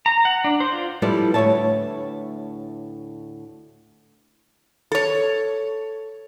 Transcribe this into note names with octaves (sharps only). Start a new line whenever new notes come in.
A#5
F#5
D4
C5
F4
F3 G3 E4 A4 B4 D5
D2 A2 B4 C#5 E5 A5
A4 C#5